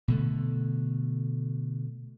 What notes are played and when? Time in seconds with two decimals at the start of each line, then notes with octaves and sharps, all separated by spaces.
0.08 B2 D3 A3